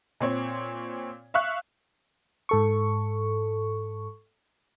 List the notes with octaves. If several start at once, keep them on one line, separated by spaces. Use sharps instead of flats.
A#2 C4 C#5
E5 F5 C#6 F#6
G#2 A4 C#6